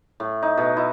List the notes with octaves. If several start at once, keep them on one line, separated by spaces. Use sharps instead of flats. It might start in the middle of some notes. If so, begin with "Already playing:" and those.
A2
D#4
B2
E4